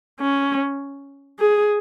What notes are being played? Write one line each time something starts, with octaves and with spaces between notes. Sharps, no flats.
C#4
G#4